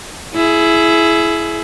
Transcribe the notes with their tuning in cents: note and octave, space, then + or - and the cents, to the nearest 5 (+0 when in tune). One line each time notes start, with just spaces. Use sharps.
E4 +10 G#4 +30